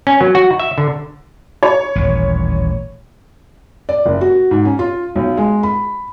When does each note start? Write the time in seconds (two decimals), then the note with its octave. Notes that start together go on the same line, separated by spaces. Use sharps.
0.07 C#4
0.21 F#3
0.35 F#4
0.60 E5
0.78 D3
1.63 C#5
1.96 D#1 A1
3.89 D5
4.06 F#1
4.21 F#4
4.51 G#2
4.65 C#4
4.79 F4
5.16 B1
5.37 G#3
5.63 B5